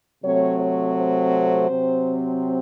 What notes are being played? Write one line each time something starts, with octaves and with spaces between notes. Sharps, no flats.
C3 F#3 A3 C4 C#5
C#5
C5
C3 F#3 C4